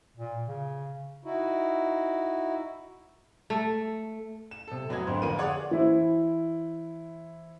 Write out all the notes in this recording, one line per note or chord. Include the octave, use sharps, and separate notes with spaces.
A#2
C#3
D#4 E4 F#4
A3
E7
C3 A4
F1 F#3 B4 D#5 G#6
G#1 D3 B4 C5
F2 D3 D4 A#4 D#7
G#4 C#5 D5 F#5 G#6
E3 E4 C5